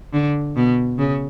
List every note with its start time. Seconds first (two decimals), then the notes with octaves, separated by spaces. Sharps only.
0.13 D3
0.56 B2
0.99 C#3